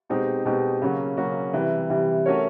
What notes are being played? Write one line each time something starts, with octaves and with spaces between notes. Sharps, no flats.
B2 G#3 C4 D#4 G4
B2 G#3 C4 D#4 G4
C#3 F#3 A#3 C#4 F#4
C#3 F#3 A#3 C#4 F#4
C3 E3 G3
C3 E3 G3
A3 C#4 F#4 A#4 C#5